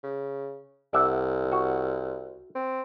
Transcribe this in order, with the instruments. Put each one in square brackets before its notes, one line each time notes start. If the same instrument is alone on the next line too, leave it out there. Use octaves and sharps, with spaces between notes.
[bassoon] C#3
[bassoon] C2 [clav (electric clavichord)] D5 E5 F#5
[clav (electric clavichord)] F#4
[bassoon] C4